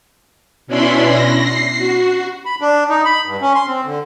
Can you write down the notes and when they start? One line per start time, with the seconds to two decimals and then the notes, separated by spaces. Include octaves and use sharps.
0.67 B2 C#4 D4 E4 B5 C6
1.09 A#6
1.42 C7
1.78 F#4
2.46 B5
2.61 D4
2.90 D#4
3.05 B5
3.26 G2
3.41 C#4
3.55 C6
3.67 C4
3.84 D3